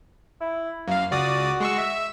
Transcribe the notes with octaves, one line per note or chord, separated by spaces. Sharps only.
E4
F#2 A#3 F5
C#2 F#4 D5 D#6
G#3 C#6 E6
E5 E6